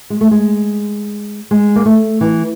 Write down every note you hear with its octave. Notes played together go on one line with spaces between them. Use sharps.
G#3
A3
G#3
G#3
A#3
A3
E3